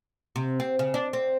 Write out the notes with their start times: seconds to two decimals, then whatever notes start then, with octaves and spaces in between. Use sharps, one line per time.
0.36 C3
0.60 C4
0.79 C#3
0.94 D4
1.13 C4